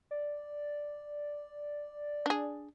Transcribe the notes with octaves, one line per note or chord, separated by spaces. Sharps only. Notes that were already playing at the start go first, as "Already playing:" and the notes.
D5
D4 G#4